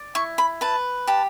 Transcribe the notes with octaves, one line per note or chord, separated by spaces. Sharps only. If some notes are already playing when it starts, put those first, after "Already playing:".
Already playing: D5
E4 C#6
B5
B4 A5
G4 A5